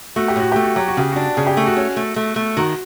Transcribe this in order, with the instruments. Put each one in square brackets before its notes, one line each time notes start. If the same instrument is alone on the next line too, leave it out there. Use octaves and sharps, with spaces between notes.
[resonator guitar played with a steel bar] A3 [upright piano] F#4
[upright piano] G4
[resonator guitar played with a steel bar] A2 [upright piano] F#4
[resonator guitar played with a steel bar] A3 [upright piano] G4
[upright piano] F#4
[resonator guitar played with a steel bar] F#3 [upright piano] G4
[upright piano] F#4
[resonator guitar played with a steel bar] C#3 [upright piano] G4
[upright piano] F#4
[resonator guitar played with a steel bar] D4
[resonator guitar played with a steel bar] C#3 [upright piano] G#4
[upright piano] G4
[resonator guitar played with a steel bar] A3
[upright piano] F#4
[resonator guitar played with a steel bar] C#4
A3
A3
A3
[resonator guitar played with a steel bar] D#3 [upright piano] F#4